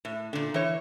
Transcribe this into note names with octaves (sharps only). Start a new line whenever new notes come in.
A2
A#2 D3
E3 C#5